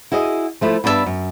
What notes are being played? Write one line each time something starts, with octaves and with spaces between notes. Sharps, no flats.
E4 F#4 G#4 D#5
F3 A3 E4
G2 B3 D4 D#4 E5 A5
F#2